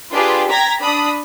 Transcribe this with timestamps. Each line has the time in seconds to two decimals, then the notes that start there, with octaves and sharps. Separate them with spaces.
0.13 D4 F4 G4 G#4 B4
0.50 G5 A#5 G#6 A#6 B6
0.82 D4 B5 D#6